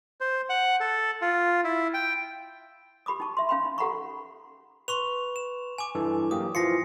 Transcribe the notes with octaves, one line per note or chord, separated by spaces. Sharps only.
C5
F#5
A4
F4
E4
G5
G4 B5 D6 D#6
D#4 G5 A5 C#6
E5 C6
C#4 F5 G5 B5 C6
D#4 B5
G4 A4 F#5 A#5 B5 C#6
B4 C6 C#6 F7
E7
G#5 D6
G2 E3 A4
F#3 A#3 G4 D#6
E3 F3 F4 A#6 C7 C#7